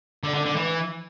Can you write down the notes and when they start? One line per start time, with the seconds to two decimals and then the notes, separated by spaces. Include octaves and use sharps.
0.23 D3
0.34 D3
0.45 D3
0.56 E3